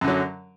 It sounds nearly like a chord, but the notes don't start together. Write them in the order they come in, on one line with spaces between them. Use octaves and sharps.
F#2 D3 F#3